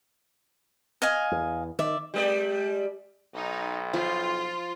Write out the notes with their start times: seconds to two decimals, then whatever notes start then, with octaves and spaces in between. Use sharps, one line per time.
1.02 D#5 F5 G#5
1.32 E2
1.79 D#3 D5 E5
2.14 G3 G#3 D5
3.35 B1 D#4
3.94 F3 F4